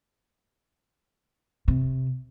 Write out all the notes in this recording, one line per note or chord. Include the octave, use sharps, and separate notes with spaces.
C3